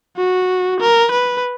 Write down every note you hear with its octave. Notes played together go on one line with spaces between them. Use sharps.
F#4
A#4
B4